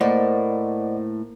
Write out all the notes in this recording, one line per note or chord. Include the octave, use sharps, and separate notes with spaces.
A2 A#3 C5 D5 D#5 F#5